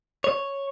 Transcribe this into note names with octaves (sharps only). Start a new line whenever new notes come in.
C#5